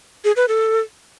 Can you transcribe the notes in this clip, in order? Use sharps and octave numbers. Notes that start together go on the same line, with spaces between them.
G#4
B4
A4